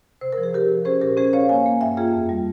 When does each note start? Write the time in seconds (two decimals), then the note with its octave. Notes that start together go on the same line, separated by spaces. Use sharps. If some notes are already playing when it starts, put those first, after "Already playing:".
0.21 C3 C5
0.33 F3 A#4
0.43 G#4
0.53 C3 G4 A#4
0.69 F3
0.85 C#4 G#4 C5
1.01 A#2 G4 A#4
1.17 C#4 G#4 C5
1.33 C#4 C#5 F5
1.49 A#3 F5 G#5
1.66 A#3
1.81 G2 E5 G5
1.97 A#3 F4 G#4
2.13 F2
2.29 G3